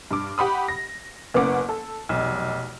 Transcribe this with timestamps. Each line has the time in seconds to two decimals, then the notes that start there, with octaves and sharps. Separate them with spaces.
0.11 G2 D6
0.38 G4 F#5 B5 D#6
0.68 A#6
1.34 F#1 A#3 B3 C#4 F#5 D6
1.69 A4
2.09 F1 B1